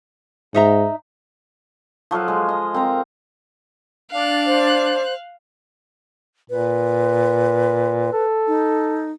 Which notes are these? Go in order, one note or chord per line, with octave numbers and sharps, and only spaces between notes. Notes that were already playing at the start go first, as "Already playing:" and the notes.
G#2 D#4 E5 A#5
F3 F#3 A4 F5
G#3
D#5
C4 A#4 A#5
D4 F5 F#6
C5
A#2 B4
A4
D#4